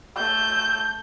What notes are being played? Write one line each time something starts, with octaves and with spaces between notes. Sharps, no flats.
A3 G6